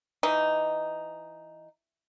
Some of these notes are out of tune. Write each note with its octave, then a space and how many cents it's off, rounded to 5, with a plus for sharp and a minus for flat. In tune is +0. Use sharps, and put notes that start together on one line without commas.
E3 +10 D#4 +0